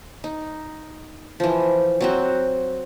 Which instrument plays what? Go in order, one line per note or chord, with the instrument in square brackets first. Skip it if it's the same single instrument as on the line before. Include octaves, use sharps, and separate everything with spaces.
[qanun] D#4
E3 F3
F#3 C4 F#4